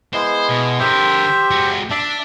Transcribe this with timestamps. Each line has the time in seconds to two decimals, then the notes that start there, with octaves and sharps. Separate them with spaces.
0.14 G#3 B3 E4 C5
0.50 B2
0.80 D3 G4 A#4 C5 E5
1.51 G#3 F#4
1.91 D4 D5 E5 A5